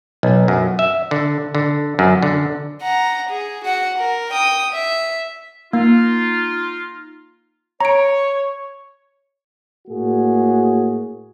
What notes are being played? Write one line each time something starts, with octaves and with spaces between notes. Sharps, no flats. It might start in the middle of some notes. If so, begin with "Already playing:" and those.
B1
F#2
E5
D3
D3
F#2
D3
F#5 A#5
G#4
F#4 F#5
A#4
G5 D#6
E5
A#3 D#4 F4
C#5 A#5 D7
A2 A#3 F#4 G#4